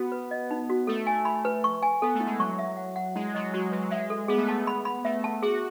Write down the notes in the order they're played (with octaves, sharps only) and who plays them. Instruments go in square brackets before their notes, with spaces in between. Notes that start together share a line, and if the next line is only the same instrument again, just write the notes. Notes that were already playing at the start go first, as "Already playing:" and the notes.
Already playing: [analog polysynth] B3 [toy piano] F#4
[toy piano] B4
D#5
D#4
F#4
[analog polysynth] A3 [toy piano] A4
[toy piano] G#5
B5
B4
C#6
G#5
[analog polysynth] B3 [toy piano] A4
[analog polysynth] A3
[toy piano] E4
[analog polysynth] G#3
[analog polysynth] F#3 [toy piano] C#6
[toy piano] E5
F#5
F#5
[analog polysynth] G#3 [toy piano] E4
[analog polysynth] F#3 [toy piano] D#5
[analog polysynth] G#3 [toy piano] F#4
[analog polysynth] F#3 [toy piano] B4
[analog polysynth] G#3 [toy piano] E5
[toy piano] A4
[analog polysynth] B3 [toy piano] G#4
[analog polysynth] A3
[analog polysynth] B3 [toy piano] A5
[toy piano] B5
B5
[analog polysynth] A3 [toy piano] E5
[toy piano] A5
[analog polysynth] F#4 [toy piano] G#4